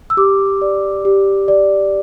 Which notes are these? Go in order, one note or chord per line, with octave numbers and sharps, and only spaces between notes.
E6
G4 D6
D5
G4
D5